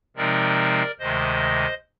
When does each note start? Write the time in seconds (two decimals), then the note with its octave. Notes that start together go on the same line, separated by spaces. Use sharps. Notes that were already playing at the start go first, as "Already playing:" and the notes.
0.16 C3 F3 G#3 C4 D#4 A#4 D5
0.99 D2 C3 D#3 G#3 C5 D#5